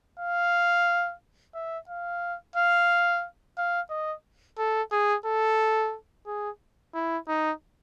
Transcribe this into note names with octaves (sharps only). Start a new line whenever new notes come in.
F5
E5
F5
F5
F5
D#5
A4
G#4
A4
G#4
E4
D#4